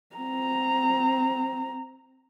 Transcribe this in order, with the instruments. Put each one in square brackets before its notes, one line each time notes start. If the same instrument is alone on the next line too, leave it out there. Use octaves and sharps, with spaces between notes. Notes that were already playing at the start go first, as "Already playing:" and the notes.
[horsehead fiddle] C4 A#5